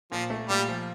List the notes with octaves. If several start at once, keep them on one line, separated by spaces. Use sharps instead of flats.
A#2 F3
A3
A#2 G3
F3